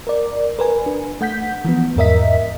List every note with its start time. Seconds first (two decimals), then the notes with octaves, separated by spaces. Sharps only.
0.07 A#4 D5
0.59 A#4 B4 G#5
0.86 D4
1.21 A3 F#5 G6 B6
1.65 E3 F3 B3
1.96 E2 G#2 A#4 D#5 E5 B6